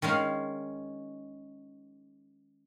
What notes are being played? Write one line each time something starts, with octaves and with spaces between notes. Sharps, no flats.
D#3 G#3 C#4 F5